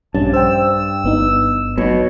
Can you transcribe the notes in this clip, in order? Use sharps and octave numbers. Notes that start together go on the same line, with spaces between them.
A#1 G2 C#4 A5
C5 G5 E6
G1 B3 D#4
B1 B2 C#5